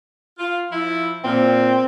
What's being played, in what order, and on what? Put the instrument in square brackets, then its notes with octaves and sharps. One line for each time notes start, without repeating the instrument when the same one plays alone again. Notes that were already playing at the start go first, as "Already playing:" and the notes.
[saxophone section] F4
F3 E4
[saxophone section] A#2 [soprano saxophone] C4